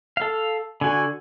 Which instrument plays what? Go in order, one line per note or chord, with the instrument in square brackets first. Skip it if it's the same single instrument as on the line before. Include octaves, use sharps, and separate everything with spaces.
[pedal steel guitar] A4 F5
[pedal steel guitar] D3 F#4 [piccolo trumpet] G#5